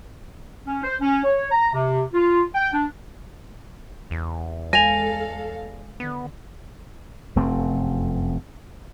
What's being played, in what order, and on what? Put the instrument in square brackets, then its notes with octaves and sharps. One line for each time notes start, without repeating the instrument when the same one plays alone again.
[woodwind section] C#4
C5
C#4
C#5
A#5
C3
F4
G5
D4
[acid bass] E2
[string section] G#3 A4 F5 [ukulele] G#5 [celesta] A#6 F7
[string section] D3 [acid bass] B3
[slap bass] F1 F#2 A3 C4